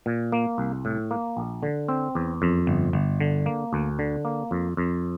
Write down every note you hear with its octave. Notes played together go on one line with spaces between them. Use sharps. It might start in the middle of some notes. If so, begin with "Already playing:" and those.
A#2
A#3
C2
A2
A#3
A#1
D3
C4
E2
F2
G1
G1
D3
A#3
D2
D3
A#3
F2
F2